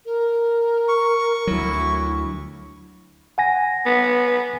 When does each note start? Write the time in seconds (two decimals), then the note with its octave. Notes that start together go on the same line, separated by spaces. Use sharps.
0.05 A#4
0.88 C#6
1.47 D2 F#3 E4
3.38 F#5 G#5 A#6
3.86 B3